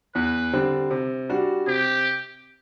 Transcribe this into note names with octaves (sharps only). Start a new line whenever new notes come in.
E2 B4
D3 G3 C4
C3
G3 D4 F#4
C3 G4